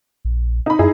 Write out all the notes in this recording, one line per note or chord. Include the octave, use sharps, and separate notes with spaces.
A#1
D#4 B5
F#2 D#4 E4 G#4